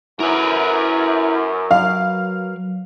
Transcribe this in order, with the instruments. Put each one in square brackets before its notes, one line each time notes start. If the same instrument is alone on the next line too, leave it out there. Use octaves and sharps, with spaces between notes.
[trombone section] F#2 [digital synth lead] E4 [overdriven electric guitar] A#4 B4
[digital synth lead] F#3 [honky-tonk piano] F5